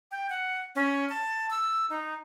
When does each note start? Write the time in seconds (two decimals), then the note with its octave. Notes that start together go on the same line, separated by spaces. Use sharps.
0.11 G5
0.30 F#5
0.76 C#4
1.09 A5
1.50 E6
1.90 D#4